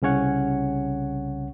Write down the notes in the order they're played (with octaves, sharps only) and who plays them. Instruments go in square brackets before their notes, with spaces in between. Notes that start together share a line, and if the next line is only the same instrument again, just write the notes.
[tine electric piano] C2 C#3 C#4 C#5 F#5